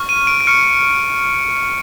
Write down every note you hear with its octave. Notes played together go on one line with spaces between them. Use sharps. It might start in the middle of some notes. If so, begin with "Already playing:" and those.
Already playing: C#6 F6
D#7
D7
D7
C#6 F6 C#7